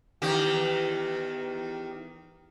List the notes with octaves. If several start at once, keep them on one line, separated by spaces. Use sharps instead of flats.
E2 D#3 G4